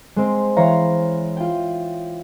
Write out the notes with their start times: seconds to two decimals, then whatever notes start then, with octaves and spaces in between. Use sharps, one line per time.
0.16 G#3 C4
0.57 E3 C5 C#5 F5 A#5
1.37 F4 G5